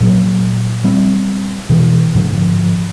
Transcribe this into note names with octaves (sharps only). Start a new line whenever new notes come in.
A#2 F#3
G3 C4
B2 E3
G#2 D3 F3